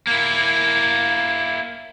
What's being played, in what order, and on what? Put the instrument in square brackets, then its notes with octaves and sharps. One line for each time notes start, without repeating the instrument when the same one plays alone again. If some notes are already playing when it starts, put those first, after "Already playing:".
[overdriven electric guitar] A#3 E4